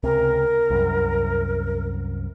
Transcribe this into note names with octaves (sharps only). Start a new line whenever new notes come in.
C#2 C3 A#4
C2 F#2